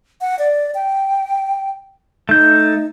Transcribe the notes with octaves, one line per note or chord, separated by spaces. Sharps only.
F#5
D5
G5
A3 D#4 G6